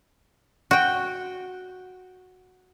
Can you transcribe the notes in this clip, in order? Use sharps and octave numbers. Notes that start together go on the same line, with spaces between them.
F#4 G5